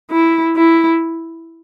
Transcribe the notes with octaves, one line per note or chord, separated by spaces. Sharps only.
E4
E4